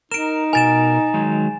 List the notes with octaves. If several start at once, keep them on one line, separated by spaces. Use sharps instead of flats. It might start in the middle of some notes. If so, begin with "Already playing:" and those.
D#4 A#4 D7 E7
B2 A#4 G#5 A6 E7
D#3 F#3 G#3